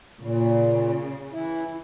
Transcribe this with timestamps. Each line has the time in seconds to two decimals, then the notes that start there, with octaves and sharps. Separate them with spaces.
0.21 A#2 C#3
1.33 E3 E4